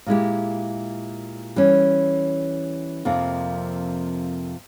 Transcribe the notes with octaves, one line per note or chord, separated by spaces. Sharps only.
A#2 G#3 E4 G4
E3 G3 C#4
F2 C3 F3 A#3